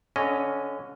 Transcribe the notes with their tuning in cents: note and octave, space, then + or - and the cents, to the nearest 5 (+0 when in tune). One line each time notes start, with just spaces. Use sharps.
D3 -30 C#4 -5 D#5 -5